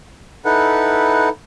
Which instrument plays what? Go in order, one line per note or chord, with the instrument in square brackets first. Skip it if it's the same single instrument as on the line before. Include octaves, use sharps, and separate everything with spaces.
[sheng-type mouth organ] D#4 E4 A4 B4 F#5